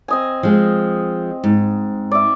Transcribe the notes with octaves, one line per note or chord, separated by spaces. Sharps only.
C4 D#5 G#5
F3 G#3
G#2
D5 E5